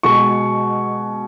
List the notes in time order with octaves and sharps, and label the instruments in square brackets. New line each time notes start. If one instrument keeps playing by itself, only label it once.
[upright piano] B2 G#3 C#6